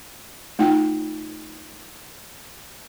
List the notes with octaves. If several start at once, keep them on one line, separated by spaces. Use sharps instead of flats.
A3 D#4 F4 G5